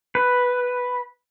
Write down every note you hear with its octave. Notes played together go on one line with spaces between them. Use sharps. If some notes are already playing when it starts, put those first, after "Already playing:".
B4